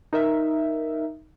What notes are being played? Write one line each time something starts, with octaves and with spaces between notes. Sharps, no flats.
D#4 A#4 E5